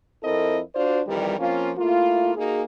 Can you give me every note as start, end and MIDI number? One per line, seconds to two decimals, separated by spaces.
0.23 0.60 41
0.23 0.60 60
0.23 0.60 64
0.23 0.60 69
0.23 0.60 70
0.23 0.60 75
0.75 1.01 62
0.75 1.01 65
0.75 1.01 66
0.75 1.01 72
0.75 1.01 74
1.07 1.38 41
1.07 1.38 51
1.07 1.38 52
1.07 1.38 55
1.39 1.72 53
1.39 1.72 58
1.39 1.72 60
1.39 1.72 61
1.39 1.72 65
1.78 2.35 57
1.78 2.35 58
1.78 2.35 64
1.78 2.35 65
2.36 2.63 58
2.36 2.63 63
2.36 2.63 66
2.36 2.63 68